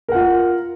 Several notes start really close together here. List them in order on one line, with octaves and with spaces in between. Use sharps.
A#4 F#5 F4